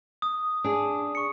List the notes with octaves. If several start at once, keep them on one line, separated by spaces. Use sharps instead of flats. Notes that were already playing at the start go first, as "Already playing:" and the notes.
D#6
D4 G#4
C#6 C#7